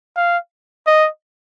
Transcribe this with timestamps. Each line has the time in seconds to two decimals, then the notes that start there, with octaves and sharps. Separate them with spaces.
0.16 F5
0.87 D#5